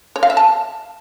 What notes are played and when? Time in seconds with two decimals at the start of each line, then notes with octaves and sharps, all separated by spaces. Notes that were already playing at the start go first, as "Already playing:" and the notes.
0.16 C#5
0.23 F5
0.30 E5
0.37 A5